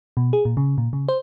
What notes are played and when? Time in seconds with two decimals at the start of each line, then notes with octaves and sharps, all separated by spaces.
0.17 B2
0.33 G#4
0.45 A#2
0.57 C#3
0.78 A#2
0.93 C#3
1.09 C5